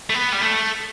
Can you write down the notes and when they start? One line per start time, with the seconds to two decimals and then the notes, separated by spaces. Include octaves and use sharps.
0.10 A3
0.14 B3
0.33 G3
0.41 A3